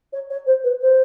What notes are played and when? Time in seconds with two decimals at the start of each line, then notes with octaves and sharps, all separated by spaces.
0.12 C#5
0.30 C#5
0.46 C5
0.64 B4
0.81 C5